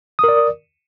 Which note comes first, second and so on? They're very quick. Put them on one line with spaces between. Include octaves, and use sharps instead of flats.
D#6 A#4 D5